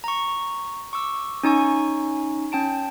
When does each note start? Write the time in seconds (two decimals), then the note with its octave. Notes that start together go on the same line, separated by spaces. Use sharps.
0.04 A#5 C#6
0.93 C#6 D6 E6
1.43 C#4 D#4 G#5 C#6
2.52 C#4 G5 A5 D7